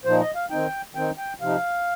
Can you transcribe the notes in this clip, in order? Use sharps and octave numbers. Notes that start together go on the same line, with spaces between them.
A#2 F3 D#4 C5
D#5
F5
D#3 C4 D#4 G5
D#3 C4 D#4 G5
G5
C3 F3 D#4 F5